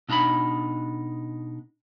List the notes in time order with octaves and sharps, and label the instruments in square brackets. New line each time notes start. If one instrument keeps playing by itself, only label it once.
[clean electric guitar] B2 D4 D#4 A#5 B5